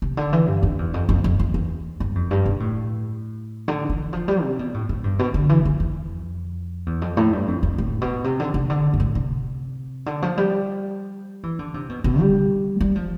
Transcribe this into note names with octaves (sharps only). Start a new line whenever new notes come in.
C3
D3
E3
G2
F2
E2
F2
F2
F2
F2
E2
G2
F2
G2
B2
A2
D3
E3
F3
G3
C3
B2
A2
A2
G2
B2
D3
E3
E3
F2
E2
F2
A2
G2
F2
F2
A2
B2
C3
D3
C3
D3
G2
A2
C3
D3
F3
G3
E3
D3
C3
B2
B2
G3
G3
F3